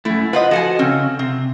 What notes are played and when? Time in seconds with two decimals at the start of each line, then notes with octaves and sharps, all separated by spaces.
0.05 F#2 A3 E4
0.33 F4 B4 C5 D#5 F#5
0.51 F3 F#4 A4 F#5 G#5
0.79 C#3 C4 C#4
1.19 C3 C4